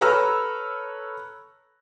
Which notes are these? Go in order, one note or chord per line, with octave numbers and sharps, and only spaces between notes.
A4 B4 C#5 A#5 E6 F6